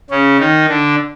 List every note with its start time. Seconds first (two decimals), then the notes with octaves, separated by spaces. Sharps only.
0.10 C#3 C#4
0.39 D#3 D#4
0.69 D3 D4